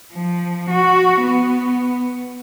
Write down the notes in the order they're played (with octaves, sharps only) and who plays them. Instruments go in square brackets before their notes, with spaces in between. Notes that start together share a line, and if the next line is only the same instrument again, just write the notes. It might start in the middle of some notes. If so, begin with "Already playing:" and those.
[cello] F3
F#4
B3